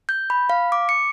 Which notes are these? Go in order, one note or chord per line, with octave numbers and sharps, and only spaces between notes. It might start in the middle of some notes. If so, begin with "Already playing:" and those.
G6
B5
F5
D6
C#7